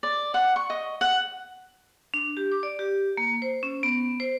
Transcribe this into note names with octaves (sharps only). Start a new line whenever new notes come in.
D5
F#5
C#6
D#5
F#5
D4
G4
D6
D5
G4
A#3
C5
C#4
B3
C5